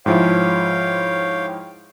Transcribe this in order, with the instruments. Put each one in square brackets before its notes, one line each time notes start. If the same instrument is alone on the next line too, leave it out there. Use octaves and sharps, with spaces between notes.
[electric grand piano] G#2 F3 E4 [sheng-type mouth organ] C#5 F5 G5